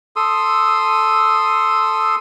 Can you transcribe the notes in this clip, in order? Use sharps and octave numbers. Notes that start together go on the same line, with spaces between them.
A4 C6 D#6 E6